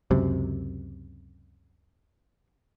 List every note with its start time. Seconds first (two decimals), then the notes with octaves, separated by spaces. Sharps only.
0.11 C#2 F#2 C3